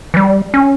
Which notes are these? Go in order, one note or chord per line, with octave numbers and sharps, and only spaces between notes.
E3
G3
C#4